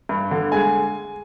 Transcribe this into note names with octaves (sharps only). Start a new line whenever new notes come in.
G2
D3
G#3 G#5